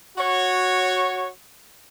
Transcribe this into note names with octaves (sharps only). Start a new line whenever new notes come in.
F#4 C#5